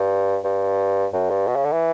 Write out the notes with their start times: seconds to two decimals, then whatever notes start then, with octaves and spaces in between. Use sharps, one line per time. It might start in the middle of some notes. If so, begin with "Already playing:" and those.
Already playing: G2
0.44 G2
1.13 F#2
1.30 G2
1.47 B2
1.56 C#3
1.64 D3
1.72 E3